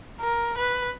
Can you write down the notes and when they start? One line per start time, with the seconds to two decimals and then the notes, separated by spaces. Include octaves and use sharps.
0.20 A#4
0.58 B4